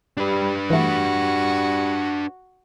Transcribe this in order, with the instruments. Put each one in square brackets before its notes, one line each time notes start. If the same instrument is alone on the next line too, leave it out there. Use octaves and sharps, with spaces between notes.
[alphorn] G3 [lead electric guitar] D4 B4
[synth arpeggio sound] E3 A3 [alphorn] G3 [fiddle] F#4